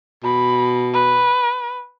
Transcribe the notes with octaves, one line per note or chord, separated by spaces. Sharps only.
B2 B5
B4